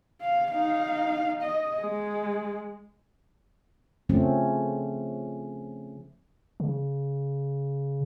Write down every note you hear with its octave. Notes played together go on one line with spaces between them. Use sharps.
F5
D#4 F5
D#5
G#3
C#3 F3 A3 C4 C#4
C#3